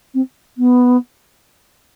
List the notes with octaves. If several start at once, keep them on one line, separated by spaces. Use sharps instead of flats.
C4
B3